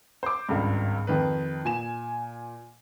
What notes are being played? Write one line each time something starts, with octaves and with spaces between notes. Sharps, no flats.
C5 D6
G#1 C#2 G2
F2 D#3 B4
A#2 G#5 E7